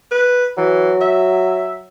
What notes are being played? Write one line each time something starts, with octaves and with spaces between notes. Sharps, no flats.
B4
E3 F#3
E5